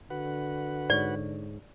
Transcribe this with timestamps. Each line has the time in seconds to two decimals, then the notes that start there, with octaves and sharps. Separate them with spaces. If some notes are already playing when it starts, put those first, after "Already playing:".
0.10 D3 F#4 B4 F#5
0.90 G#2 C#5 D5